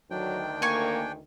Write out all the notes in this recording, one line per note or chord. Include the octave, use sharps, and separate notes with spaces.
D2 D#3 F#3 D4 G5
A#3 G#5 C#6